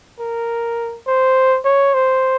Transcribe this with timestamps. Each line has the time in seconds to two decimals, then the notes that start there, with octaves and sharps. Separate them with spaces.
0.20 A#4
1.06 C5
1.65 C#5
1.94 C5